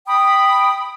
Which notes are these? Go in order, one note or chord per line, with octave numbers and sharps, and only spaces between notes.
G5 B5 D#6